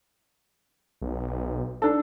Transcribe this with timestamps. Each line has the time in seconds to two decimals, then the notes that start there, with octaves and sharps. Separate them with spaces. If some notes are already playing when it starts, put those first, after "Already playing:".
1.02 B1
1.82 D4 A4